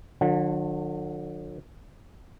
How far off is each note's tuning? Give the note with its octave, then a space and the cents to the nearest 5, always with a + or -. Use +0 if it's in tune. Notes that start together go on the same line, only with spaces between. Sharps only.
D3 +25 F#3 -45 F#5 -40